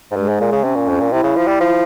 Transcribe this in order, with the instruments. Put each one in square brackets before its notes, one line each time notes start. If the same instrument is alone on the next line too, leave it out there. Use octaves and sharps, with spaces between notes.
[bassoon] G#2
[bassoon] G2 [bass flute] G#3
[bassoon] G#2
A#2
C#3
[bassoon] C3 [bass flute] C#4
[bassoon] A#2
F2
A#2
[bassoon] C3 [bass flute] E4
[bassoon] C#3
F3
G3
F3